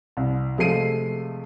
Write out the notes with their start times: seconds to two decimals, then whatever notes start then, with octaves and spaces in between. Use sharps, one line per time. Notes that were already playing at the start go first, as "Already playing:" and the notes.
0.17 C2
0.57 C3 F3 G#3 A3 C7 D#7